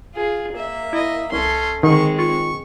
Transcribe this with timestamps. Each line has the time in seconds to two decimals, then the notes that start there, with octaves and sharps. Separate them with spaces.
0.14 F4 G#4
0.53 A#3 E5
0.93 E4 D#5
1.32 C2 C#4 A4 C6
1.83 D3 D#3 G#3 C4 C#6
2.19 F4 C#6